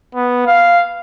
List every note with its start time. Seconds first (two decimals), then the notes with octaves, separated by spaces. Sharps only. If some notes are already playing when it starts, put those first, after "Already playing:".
0.15 B3
0.47 F5